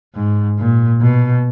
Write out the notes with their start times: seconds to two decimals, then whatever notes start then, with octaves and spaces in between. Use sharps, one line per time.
0.15 G#2
0.58 A#2
1.01 B2